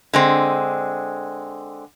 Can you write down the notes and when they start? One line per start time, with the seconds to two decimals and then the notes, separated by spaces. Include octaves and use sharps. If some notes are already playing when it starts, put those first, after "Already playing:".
0.14 D3 G#3 C4